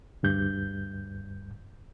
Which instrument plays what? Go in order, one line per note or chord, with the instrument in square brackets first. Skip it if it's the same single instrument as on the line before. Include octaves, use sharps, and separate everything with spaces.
[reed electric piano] D2 G2 G6